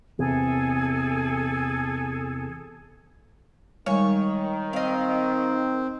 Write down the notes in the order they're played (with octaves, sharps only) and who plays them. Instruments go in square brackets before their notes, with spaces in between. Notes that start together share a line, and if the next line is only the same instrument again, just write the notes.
[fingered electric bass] E2 C3 [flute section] G#4 A4
[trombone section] D#3 [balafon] G3 G#3 G#5 [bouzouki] C#5
[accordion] C4 [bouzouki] D#5 F5